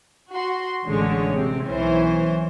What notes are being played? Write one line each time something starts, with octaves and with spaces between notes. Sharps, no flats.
F#4 C6
A1 D3 G#3 C#4 C#5
C3 C4
B1 E3 C#4 C5